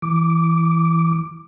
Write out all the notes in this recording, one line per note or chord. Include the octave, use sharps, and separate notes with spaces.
E3 D6